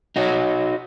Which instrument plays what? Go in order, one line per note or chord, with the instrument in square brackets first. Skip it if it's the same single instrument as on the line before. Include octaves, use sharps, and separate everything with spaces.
[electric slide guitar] D#4 F#4 C#5